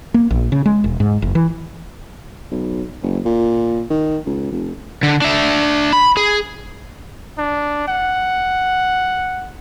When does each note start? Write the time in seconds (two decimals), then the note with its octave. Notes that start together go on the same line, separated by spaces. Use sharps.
0.14 A#3
0.31 A#1
0.52 C#3
0.66 G#3
0.84 E1
1.00 G#2
1.22 F#1
1.35 E3
2.52 B1
3.03 F#1
3.25 A#2
3.90 D#3
4.26 C#2
4.52 F1
5.03 D3
5.22 D4 E5
5.93 B5
6.17 G#4
7.38 D4
7.88 F#5